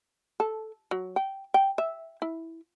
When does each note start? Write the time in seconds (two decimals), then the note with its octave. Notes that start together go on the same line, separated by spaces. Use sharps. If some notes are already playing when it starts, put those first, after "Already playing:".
0.40 A4
0.91 F#3
1.16 G5
1.54 G5
1.78 E5
2.22 E4